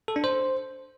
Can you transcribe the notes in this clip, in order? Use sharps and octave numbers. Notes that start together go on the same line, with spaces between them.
A4
D4
C5